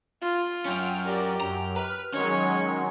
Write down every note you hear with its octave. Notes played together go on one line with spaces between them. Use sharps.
F4
F#2 C#4 G5 F6
G4 A#4 D5
F#2 A#5
B4 F6
D#3 F#3 G#3 C#4 C#5